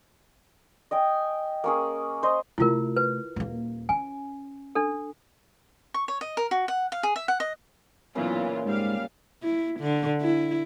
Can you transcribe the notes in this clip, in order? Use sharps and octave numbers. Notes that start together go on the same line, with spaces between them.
D#5 G5 G#5
A#3 C#4 G#4
C5 D#5
C3 A3 E4 F4 A#4
B4
D#1 A#3
C#4 G#5
D4 A4
C#6
C#5
D#5
A#4
F#4
F#5
F5
G#4
E5
F#5
D#5
B1 A#2 C#3 E3 F4
G#2 G3 F5
E4
D3
E4